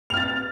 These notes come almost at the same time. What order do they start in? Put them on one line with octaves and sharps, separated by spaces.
F7 F6 A6